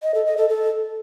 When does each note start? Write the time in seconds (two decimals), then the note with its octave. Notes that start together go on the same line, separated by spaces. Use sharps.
0.03 D#5
0.14 A4
0.26 D#5
0.37 A4
0.49 A4